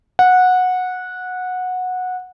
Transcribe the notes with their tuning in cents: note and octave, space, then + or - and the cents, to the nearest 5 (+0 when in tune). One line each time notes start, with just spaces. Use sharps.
F#5 -15